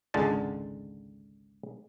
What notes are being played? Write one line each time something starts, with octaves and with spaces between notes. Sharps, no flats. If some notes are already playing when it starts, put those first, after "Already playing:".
G#1 C#2 D3 G#3 A5